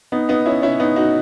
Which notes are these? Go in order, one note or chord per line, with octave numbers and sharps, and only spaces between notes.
B3 D#4
B3 D#4
C#4 E4
C#4 E4
B3 D#4
D#4 F#4